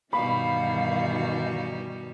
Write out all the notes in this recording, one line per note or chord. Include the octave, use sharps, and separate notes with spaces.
G2 B2 D#3 E3 G3 F#4 F5 B5